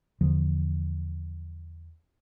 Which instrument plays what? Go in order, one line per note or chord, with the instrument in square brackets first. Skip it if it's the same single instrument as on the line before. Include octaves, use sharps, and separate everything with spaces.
[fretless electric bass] E2 D3 F3